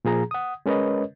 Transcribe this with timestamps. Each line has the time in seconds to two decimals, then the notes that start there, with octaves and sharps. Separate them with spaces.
0.05 A#2 F3 G#4 A#5
0.31 F#5 D#6
0.66 G#3 C#4 A#4 B4 C#5 D#5